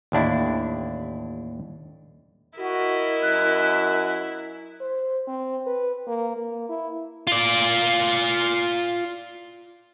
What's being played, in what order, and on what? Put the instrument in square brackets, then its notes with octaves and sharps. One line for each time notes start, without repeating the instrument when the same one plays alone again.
[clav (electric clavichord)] A1 D#2 D4 E4
[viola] E4 [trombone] F#4 [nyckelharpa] A#4 D#5
[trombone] F#2 [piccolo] F#6
[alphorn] C5
C4
B4
A#3
A#3
E4
[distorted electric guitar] F4 D5